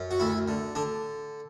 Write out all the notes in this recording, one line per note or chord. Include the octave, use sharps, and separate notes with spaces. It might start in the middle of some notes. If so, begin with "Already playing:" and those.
Already playing: F#2
F#4
D2 E4
D3
D3 D4